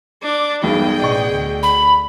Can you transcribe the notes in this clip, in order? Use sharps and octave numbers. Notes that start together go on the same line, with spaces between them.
D4 D6
E1 B1 E2 G2 G#4 G5
A1 B2 D5 D#5 C#6
D2 D3
B5